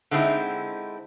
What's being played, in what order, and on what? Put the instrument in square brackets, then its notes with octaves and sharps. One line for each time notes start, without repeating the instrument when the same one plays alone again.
[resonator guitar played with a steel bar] D3 G#3 C4 D#4 E4